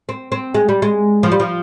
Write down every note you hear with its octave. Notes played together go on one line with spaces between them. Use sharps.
C4
C4
G#3
G3
G#3
F3
G3
F3